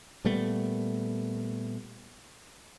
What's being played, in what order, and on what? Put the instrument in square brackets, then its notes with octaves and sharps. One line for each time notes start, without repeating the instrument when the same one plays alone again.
[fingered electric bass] A#2 G3 A3 B3